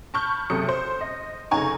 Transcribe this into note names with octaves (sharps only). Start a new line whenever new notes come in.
A5 B5 C#6 F6 G6
F#1 F#2 C3 A4 D#6 C#7
C5
D#5
F1 C#3 D#4 G#5 A#5 C#6